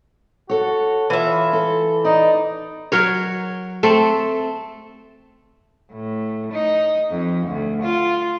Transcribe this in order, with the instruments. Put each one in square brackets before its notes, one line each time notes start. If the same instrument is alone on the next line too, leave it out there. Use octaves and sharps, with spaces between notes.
[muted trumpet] F#4 [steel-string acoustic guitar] A4 C#5
[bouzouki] E3 E5 [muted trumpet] F4
[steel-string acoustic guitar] A4
[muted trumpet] D#4 [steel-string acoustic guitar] D5 D#5
[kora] F#3 A#4 C#5
A3 C4 A4
[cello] A2
D#4
F2
D2
F4